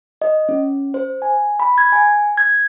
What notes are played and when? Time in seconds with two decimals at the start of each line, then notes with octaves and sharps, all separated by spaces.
0.22 D#5
0.49 C#4
0.94 C5
1.22 G#5
1.60 B5
1.78 G#6
1.93 G#5
2.37 G#6